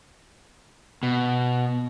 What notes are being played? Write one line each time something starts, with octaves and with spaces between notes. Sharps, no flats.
B2